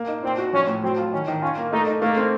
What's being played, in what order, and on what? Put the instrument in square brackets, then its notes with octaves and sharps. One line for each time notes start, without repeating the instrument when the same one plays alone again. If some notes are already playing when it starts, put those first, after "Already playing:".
Already playing: [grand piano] A#3
D#4
[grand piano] A#2 [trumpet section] C4
[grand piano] F#4
[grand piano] F3 [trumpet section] C#4
[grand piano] A2
[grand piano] F#3 [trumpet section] C4
[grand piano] F4
[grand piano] D#3 [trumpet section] C#4
[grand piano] D#3
[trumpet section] C#4 [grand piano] F4
[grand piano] A#3
[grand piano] A3 [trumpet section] D#4
[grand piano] D#4
[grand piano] A3 [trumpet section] A#3
[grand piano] C4